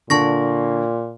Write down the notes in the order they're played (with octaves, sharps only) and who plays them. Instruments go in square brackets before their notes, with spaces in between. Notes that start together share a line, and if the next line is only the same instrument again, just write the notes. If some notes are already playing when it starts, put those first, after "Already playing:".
[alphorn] A#2 [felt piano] D3 [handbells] A5 C#6 A#6